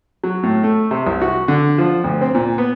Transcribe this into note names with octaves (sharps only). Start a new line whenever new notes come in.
F#3
A2
A3
C3
C2
F#4
D3
F3
D2
C4
A#2
B3